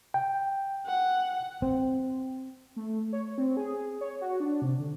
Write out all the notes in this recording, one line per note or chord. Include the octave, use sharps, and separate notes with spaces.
G5
F#5
C4
A3
C#5
C4
G#4
C#5
F#4
D4
C3
D3